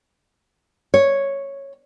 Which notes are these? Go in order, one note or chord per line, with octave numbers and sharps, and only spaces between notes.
C#5